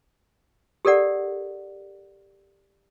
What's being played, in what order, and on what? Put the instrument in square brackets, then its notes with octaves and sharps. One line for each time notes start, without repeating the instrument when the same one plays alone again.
[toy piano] G4 A4 A#4 D5 F#5